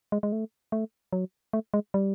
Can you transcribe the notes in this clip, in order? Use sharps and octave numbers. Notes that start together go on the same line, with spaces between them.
G#3
G#3
A3
A3
F#3
A3
G#3
G3